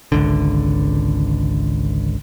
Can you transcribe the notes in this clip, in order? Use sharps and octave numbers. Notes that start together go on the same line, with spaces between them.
G#1 C#2 D3